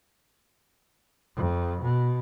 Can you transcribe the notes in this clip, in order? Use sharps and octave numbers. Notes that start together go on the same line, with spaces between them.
F2
B2